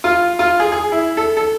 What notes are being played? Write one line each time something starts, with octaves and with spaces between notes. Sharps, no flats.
F4
F4
G#4
G#4
E4
A4
A4